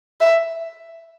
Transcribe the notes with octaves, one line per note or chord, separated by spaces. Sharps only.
E5